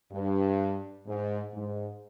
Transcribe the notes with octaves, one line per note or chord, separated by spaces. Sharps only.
G2
G#2
G#2